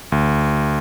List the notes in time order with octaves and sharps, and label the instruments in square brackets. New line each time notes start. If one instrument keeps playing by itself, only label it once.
[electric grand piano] D2